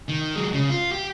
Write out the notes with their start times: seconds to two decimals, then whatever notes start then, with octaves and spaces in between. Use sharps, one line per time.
0.09 D#3
0.36 F#3 G#3
0.53 C#3
0.69 F4
0.92 G4